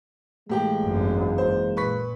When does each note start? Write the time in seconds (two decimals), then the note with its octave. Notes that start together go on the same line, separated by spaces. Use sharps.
0.50 A2 E3 G#3 A#3 G4 G5
0.84 G#1 F#2
1.38 C5
1.77 A#2 B4 C#6 B6